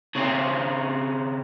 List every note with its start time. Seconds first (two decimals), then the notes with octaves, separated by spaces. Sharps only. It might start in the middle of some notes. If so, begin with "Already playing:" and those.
0.15 C#3 C4